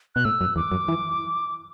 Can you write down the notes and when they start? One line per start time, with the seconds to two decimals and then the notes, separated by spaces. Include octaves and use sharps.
0.15 B2 F#6
0.25 A2 E6
0.41 F#2
0.56 E2 D6
0.72 F#2
0.88 E3